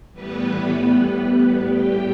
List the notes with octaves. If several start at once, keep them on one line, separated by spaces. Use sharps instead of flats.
A2 E3 G3 B3 B4
A2 G3 B3 B4
A2 G3 G4 G5